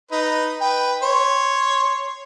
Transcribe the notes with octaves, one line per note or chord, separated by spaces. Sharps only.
D#4 B4
B4 G5
C#5 C6